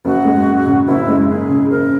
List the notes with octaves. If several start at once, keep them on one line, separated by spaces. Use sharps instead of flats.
F#1 F#4
G#3
F#2
C#3
F#1 E4
G#3
F#2 G#4
C#3
F#1 A#4